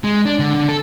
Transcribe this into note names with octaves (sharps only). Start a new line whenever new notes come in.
G#3
D4
D3
D3
A4